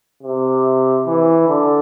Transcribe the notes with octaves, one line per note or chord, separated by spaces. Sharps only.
C3
E3
D3